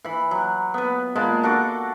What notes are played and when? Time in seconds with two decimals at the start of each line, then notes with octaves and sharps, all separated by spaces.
0.05 E3 B5
0.31 F#3
0.74 B3 B4
1.16 A#2 G#3 A5 B5
1.43 D4 F#4 A4 D6